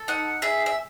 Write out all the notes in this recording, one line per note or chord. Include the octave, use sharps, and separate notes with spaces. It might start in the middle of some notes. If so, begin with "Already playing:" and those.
Already playing: A4
D#4 F#5
G#4 E5
E5